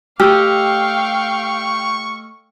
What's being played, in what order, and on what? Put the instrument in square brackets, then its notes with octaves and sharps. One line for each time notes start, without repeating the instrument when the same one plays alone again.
[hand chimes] A3 E6 F6 [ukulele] G4 [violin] F5 G5 [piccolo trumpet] C#6